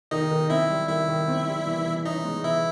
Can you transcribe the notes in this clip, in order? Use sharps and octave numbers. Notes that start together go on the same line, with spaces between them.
D#3 D#4 D#5
D#3
C4 E4 E5
G3
D#3 E4 E5
D#3
C4
G3
E3
E3
C#4 D#4 D#5
G#3
E3 E4 E5